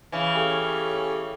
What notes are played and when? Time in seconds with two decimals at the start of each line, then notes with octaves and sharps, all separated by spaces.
0.12 C#3 E3
0.36 C#4 G4 A4